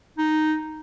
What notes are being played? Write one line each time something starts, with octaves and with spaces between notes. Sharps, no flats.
D#4